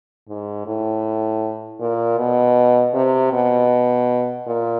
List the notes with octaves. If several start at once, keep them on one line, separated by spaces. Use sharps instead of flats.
G#2
A2
A#2
B2
C3
B2
A#2